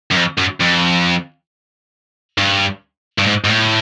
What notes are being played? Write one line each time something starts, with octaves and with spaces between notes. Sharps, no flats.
F#2
F2
F#2
F2
G2
G2
G#2
G#2
A2